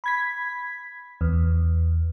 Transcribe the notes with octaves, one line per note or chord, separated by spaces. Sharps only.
B5 G#6 B6
E2